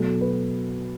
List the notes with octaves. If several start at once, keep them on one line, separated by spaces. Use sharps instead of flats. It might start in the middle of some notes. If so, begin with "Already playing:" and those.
Already playing: B2 F#3 A3
B4